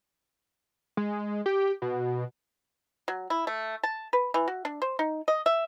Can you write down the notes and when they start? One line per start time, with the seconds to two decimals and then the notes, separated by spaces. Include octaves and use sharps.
0.97 G#3
1.46 G4
1.82 B2
3.08 F#3
3.30 E4
3.47 A3
3.83 A5
4.13 B4
4.34 E3
4.48 F#4
4.65 D4
4.82 C5
4.99 D#4
5.28 D#5
5.46 E5